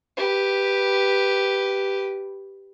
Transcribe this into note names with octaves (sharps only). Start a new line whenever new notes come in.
G4 B4